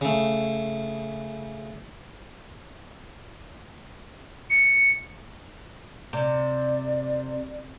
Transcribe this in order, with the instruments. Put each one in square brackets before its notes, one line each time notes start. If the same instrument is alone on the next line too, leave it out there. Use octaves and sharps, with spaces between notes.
[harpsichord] C#3 A3
[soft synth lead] C#7
[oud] C3 [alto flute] D5